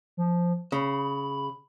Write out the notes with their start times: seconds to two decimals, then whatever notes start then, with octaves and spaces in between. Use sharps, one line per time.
0.17 F3
0.72 C#3 B5